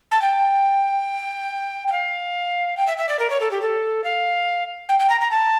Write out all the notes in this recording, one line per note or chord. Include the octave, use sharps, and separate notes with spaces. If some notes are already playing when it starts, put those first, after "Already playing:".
A5
G5
G5
F5
G5
E5
E5
D5
A#4
C#5
A4
G4
A4
F5
G5
G5
A#5
A#5
A5